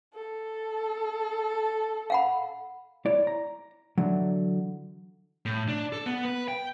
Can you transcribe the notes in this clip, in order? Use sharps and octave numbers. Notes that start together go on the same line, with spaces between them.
A4
F5 F#5 B5
E4 C#5 D5
A#5
D3 E3 F#3
A2
D4
A4
B3
B4
G5